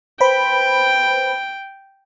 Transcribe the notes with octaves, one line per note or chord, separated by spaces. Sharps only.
B4 C5 G5 B5